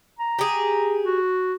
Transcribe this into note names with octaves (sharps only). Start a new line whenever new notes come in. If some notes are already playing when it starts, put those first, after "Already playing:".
A#5
G4 G#4
F#4